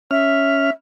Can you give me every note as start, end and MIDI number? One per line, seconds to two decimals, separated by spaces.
0.11 0.70 61
0.11 0.70 76
0.11 0.70 89